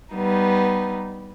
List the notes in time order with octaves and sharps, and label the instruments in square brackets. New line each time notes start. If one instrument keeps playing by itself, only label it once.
[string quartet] G3 B3 D#4